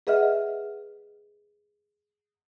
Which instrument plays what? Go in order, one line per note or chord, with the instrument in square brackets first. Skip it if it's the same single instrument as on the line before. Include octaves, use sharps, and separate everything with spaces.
[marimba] G#4 B4 D#5 E5 F#5 F6